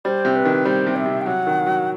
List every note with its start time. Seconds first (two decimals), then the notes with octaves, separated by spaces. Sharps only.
0.05 G3 C5
0.25 C3
0.36 B4
0.45 D#3
0.65 G3 C5
0.86 C3
0.96 E5
1.06 C3
1.22 G5
1.26 F#3 F#5
1.47 D#3
1.66 F#3